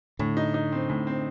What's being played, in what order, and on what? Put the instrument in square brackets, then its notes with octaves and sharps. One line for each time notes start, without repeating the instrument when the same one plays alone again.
[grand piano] A2 [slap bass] D3
[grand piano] D#4
D#4
C4
A2
C4